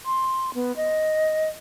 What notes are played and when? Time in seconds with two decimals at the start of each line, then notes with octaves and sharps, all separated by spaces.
0.05 C6
0.55 B3
0.76 D#5